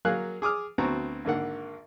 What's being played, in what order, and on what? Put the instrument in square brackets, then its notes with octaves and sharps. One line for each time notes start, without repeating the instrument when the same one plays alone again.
[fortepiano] F#3 A#3 G#4 F5 F#6
G#4 D6 D#6 F6
D2 B3 C4 F#4 A#5
G#1 D3 A#3 F#5